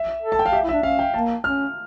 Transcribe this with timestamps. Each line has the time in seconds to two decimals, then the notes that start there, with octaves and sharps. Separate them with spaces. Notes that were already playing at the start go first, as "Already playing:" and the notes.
Already playing: E5
0.22 A4
0.32 A5
0.39 G5
0.46 F5
0.52 G4 E5
0.63 E4
0.69 E5
0.73 D4
0.83 C#4 F5
0.99 G5
1.14 A#3 A5
1.44 C#4 F6